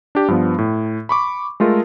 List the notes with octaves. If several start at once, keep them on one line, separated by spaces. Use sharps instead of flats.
D4 G4
G2 F3 B3
A2
B5 C#6 D6
G#3 A3 F4 A4 A#4